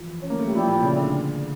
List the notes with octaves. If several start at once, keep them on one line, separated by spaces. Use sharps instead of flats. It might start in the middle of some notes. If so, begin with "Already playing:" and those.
Already playing: E3 F3
C#4
A#3
A3
G3
F3 E4 G4 D5 G5
A#2
C#3
D3